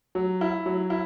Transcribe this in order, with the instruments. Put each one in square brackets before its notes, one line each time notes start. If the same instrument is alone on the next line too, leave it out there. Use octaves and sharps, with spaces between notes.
[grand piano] F#3
E4
F#3
E4